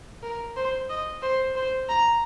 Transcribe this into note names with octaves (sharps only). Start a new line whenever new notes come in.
A#4
C5
D#5
C5
C5
A#5